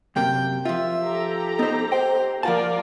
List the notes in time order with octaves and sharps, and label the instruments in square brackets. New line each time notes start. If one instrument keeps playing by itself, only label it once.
[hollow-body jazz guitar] F#2 C3 A#3 [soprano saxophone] G5
[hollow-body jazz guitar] F3 F4 [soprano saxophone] E5
[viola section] G4 A4 A#5
[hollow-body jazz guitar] B3 C5 [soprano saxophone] D#4
[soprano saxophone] C5 [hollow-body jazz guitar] G5
[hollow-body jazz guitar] F3 F#5 A5 [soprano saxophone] A#3 [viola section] F4 A#4 D5